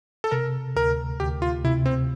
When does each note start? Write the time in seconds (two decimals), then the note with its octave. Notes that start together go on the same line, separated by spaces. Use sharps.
0.24 A4
0.31 C3 A#4
0.76 D2 A#4
1.20 D2 G4
1.42 F4
1.64 C3 E4
1.86 C4